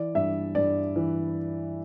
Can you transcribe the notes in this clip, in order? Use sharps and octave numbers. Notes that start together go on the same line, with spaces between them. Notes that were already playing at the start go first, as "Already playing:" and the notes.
Already playing: E3 D5
G2 E5
G2 D5
E3